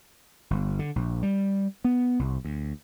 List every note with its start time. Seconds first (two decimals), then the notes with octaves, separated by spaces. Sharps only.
0.50 G1
0.79 D3
0.96 A#1
1.23 G3
1.84 B3
2.19 C2
2.45 D2